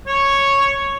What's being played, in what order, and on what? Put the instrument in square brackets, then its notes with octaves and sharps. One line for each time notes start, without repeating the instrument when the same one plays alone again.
[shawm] C#5